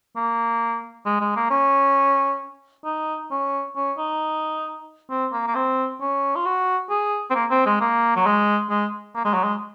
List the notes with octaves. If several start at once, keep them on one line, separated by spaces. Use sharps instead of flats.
A#3
G#3
G#3
A#3
C#4
D#4
C#4
C#4
D#4
C4
A#3
A#3
C4
C#4
F4
F#4
G#4
C4
A#3
C4
G#3
A#3
F#3
G#3
G#3
A#3
G#3
F#3
G#3